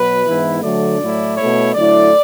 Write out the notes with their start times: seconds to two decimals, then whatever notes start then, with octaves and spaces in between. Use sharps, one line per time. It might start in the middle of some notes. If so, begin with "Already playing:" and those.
Already playing: B2 F#3 B4
0.26 G#2 E3 B3 E4
0.63 D3 F#3 A3 D4 D5
1.01 A2 F#3 A3 E4
1.37 B2 A3 E4 C#5
1.74 D3 F#3 A3 E4 D5